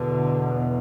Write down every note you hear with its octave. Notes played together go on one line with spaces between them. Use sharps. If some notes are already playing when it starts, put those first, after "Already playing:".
Already playing: E2 B2 D3